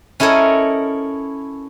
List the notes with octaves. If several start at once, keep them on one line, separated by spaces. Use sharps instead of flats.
C#4 E4 A4 A#4 C#5 D#5